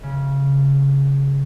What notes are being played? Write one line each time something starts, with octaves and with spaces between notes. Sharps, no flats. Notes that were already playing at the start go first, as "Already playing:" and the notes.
C#3